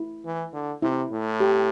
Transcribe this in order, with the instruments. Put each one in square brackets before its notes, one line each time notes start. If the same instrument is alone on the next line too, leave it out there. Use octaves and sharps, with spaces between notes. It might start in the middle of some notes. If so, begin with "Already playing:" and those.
Already playing: [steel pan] E4
[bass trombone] E3
D3
[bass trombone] C3 [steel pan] E4
[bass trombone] A2
[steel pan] G4